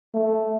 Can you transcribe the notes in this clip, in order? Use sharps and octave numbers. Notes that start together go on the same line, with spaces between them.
A3